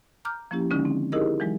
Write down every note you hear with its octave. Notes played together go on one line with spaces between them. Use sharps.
A#5 D6 F6 G6
F3 A#3 C#4 E4 G4
D3 D#3 G#3 C#4 D#4
C4
D#4 E4 G4 G#4 A#4 D#5
E3 F#3 G#3